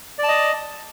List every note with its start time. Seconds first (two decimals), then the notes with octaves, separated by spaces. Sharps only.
0.19 D5
0.23 A5
0.28 D#5